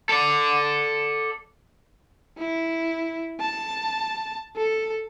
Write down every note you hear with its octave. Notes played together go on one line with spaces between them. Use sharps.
A4 D5
E4
A5
A4